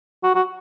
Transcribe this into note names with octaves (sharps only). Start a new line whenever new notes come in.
F#4
F#4